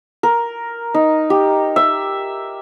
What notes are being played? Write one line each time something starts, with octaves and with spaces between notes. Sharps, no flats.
A#4
D#4
G4
E5